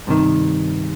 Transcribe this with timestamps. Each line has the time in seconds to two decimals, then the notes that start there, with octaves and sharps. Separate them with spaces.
0.07 G2 C3 D#3